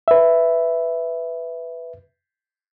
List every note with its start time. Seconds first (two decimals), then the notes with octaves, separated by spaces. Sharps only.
0.08 B4 E5